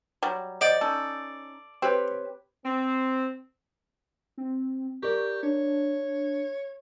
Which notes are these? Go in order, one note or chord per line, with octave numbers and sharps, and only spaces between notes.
F#3 G3
C5 D5 D#5 F#5
C#4 D#4 A4
C4 G4 B4 C#5
C4
C4
G4 A#4 D5 C#6
D4 C#5